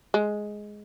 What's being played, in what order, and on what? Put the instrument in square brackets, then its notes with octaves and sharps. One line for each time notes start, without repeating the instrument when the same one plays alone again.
[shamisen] G#3